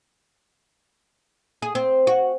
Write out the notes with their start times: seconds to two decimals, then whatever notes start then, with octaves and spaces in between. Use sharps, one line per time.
1.62 G#4
1.75 C4
2.07 F#4